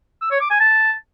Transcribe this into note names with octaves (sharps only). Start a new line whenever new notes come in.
E6
C#5
D6
G#5
A5